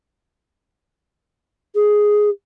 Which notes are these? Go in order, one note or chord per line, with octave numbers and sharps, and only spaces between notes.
G#4